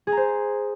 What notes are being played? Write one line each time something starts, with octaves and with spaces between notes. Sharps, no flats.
G#4
A#5
C5